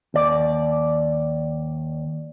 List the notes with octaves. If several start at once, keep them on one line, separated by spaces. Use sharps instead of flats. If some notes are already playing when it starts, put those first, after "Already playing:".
D#2 D5